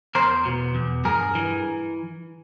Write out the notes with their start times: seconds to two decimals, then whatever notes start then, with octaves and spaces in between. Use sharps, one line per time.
0.15 E2 A#4 C5
0.45 B2
0.75 E2
1.05 G2 G#4 A#4
1.35 E3